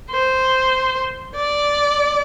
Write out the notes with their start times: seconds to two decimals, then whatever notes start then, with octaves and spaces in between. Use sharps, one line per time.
0.11 C5
1.36 D5